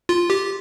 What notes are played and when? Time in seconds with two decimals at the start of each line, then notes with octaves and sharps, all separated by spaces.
0.09 F4
0.30 G4